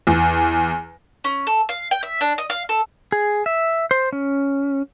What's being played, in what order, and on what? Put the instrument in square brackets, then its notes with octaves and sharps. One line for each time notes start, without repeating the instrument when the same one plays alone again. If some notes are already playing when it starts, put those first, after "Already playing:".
[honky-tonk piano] E2
[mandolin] C#4
A4
F5
G5
E5
D4
D#5
F5
A4
[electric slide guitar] G#4
E5
C5
C#4